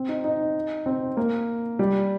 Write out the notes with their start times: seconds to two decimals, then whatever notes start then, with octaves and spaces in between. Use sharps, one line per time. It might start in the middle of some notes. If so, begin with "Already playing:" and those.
Already playing: C4
0.08 D#4
0.24 D#4
0.86 C4
1.17 A#3
1.79 G3